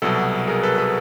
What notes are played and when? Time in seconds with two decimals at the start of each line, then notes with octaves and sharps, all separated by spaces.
0.02 C2 B2 F#3 A4
0.48 G#4 A#4
0.63 A4 B4
0.78 A4 B4